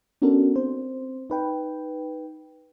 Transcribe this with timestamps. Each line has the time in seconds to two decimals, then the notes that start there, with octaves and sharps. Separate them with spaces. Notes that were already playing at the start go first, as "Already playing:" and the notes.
0.22 B3 C#4 D4 F#4 A4 A#4
0.56 C4 C5
1.30 D#4 B4 G5